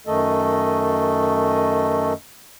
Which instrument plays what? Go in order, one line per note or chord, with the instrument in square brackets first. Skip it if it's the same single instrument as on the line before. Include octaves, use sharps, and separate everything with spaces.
[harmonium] F#2 D#3 A3 A4 D#5